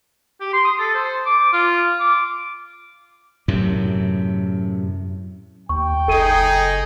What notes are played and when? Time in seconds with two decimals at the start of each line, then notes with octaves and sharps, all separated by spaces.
0.41 G4
0.53 C6
0.65 D#6
0.79 A4
0.94 C5
1.26 D6
1.53 F4
1.99 D6
3.48 F#2 A2 C3
5.69 D#2 G5 C#6
6.08 F#1 D#4 G#4 A4 D#7